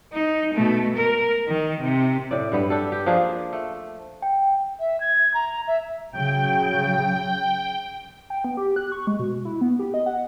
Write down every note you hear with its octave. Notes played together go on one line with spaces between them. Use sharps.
D#4
B2 A3
A#4
D#3
C3
A2 D5
G2 G3 B3
D4 G4 A4
G4
F3 A#3 D4 G#4
A3
G5
E5
G#6
A#5
E5
C#3 F#3 G5
G5
B3
G4
F#6
C#6
G#3
B2
E4
B3
G4
D#5
F#5